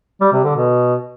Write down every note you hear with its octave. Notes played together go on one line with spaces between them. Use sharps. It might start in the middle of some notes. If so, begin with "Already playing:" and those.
G3
C3
D3
B2